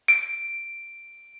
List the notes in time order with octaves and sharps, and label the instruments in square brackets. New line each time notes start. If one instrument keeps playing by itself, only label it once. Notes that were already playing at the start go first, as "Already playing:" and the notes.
[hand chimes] D7